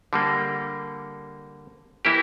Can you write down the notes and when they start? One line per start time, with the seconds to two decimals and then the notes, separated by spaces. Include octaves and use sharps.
0.13 D3 G3 A#3
2.05 E3 A#3 E4 G4